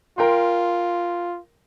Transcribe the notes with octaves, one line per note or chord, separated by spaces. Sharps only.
F4 A#4 G5 C6